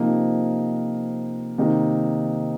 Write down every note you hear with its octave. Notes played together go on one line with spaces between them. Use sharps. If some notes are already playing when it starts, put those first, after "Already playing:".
Already playing: C3 F3 A#3 D#4
C3 D#3 A#3 D#4